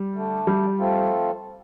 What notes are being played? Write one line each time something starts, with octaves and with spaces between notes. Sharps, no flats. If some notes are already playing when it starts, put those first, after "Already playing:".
Already playing: G3
D3 A3 D4
G3
F3 A3 C4 F4 A4